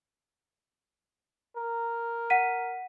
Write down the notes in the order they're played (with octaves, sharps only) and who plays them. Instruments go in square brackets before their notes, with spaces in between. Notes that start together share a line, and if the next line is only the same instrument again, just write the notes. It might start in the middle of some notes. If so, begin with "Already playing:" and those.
[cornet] A#4
[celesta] F#5 B6 D#7